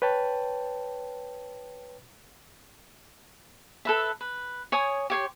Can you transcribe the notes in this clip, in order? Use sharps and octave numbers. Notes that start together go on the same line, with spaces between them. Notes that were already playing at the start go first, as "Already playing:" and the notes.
B4 C#5 G5 A5
A4 B4 E5
B4
C#5 G#5 D#6
G4 C#5 C6